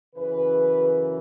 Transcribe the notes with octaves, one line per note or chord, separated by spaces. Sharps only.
F#2 C#3 E3 B4